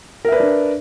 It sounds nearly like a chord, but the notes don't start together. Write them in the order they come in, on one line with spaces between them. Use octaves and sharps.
A#4 E5 B4 D5 D4